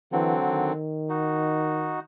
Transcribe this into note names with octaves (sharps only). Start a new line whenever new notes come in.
D3 E3 F#3 C4
D#3
D#4 F#4